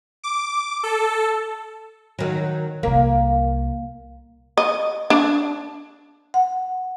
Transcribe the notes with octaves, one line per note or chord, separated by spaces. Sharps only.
D6
A4
D#3 F#3
C2 A#2 A#3
D#5
D4
F#5